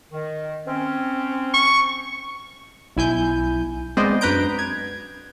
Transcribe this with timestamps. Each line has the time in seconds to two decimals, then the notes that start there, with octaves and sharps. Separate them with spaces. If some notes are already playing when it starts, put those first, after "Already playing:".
0.12 D#3
0.67 C4 C#4
1.54 C#6
2.97 B1 E4 G#5 G6
3.97 G#3 B3 C4 C5 D5 D#5
4.21 F#2 D4 B4 A#5 G6 D7
4.59 G#6